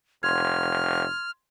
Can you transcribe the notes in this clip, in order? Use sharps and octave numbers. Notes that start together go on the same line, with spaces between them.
F1 C6 F6 G#6